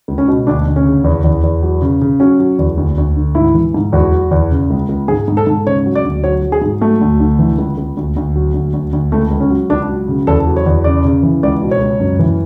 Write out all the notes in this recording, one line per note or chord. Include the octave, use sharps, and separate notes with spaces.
C#2
C#4
B2
D2 D4
D2
C#4
C#3
E2
E2
E2
F#3
C#3
C#3
F#3 C#4
F#3
E2
D2
D2
D3
G#2 E4
E3
G#2
E2 F#4
F#3
E2
C#3
C#2
C#2
G#2 G#4
G#2
A4
G#2
C#3 C#5
F#3
D5
D2
F#3 C#5
F#3
G#4
G#2
F#3 A3
D2
D3
E3
C#2
C#2
D2
D2
F#3
D2
D2
D2
C#2 A3
C#2
C#4
F#3
C#2 D4
F#3
C#3
E2 A4
F#3
C#5
E2
C#3 D5
C#3
E3
C#2 D5
B2
C#5
C#2
F#2
E3